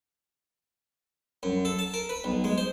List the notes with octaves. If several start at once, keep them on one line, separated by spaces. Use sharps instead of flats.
F#2
A4
A5
A#4
B4
B1
G#3
C5